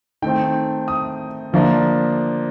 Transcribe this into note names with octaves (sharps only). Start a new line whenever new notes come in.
D#3 A3 C4 G5
D#6
D3 F3 A#3 D4